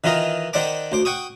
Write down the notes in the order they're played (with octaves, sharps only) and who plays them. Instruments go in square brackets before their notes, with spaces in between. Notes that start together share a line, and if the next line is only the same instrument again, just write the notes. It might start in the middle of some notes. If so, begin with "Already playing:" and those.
[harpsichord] D#3 E3 F4 A#4 D#5
D#3 C5 D5 F#5 A5 D6
D2 C5 D6
F#5 G5 C#6 D#6